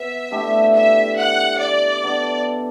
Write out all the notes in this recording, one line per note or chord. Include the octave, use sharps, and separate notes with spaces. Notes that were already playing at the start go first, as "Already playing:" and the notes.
Already playing: B3 B4 E5
D3 A3 E4 G4
E5
F#5
D5
B3 D4 A4